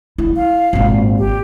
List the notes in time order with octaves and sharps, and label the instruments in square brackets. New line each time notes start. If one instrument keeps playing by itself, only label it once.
[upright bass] E4
[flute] F5
[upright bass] G#1 A#2
[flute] G4